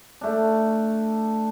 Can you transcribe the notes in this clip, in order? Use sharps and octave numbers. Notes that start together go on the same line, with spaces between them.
A3 D4